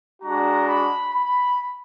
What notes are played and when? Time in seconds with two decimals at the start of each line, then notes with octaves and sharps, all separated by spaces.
0.21 G#3 D4 F#4 A#5
0.68 B5
1.14 B5